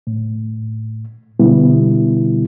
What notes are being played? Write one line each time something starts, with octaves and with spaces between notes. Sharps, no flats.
A2
B2 D3 G3 B3 E4